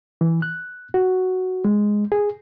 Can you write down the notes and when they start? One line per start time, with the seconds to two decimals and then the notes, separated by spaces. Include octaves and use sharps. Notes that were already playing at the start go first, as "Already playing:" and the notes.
0.21 E3
0.42 F#6
0.94 F#4
1.65 G#3
2.12 G#4